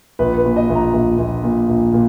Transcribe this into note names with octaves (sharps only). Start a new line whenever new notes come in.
A#1 B4
B4
A#2
D#5
A#1
A#5
A#1
A#1
A#2
A#1
A#2